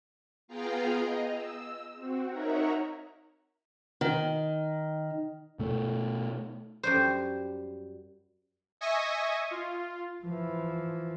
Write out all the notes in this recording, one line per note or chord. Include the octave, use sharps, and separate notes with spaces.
B3 F4 G#4 F5 G5 A#5
D#5
E6
C4 F#4
D#4 A#4 C#5 E5 F#5 A#5
D#3
B2 A3
F#2 G3 C5
D#5 E5 G#5 C#6 D#6 A#6
F4
E3 F3